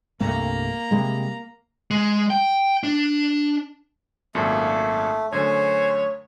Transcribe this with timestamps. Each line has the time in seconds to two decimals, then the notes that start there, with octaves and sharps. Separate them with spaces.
0.20 C2 G2 A3 A#3 A#5
0.91 C3 G3 G#3
1.91 G#3
2.30 G5
2.83 D4
4.35 G#1 F#2 A#2 A3
5.32 F#2 D3 A3 C5 C#5 G#5